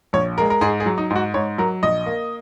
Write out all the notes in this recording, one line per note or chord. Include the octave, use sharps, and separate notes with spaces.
A#1 C#5
G#3 A#4
A#4
G#2 G#4
G#4
F#3
D#4
G#2
F#4
G#2 C#5
F#3 A#4
A#1 D#5
A#3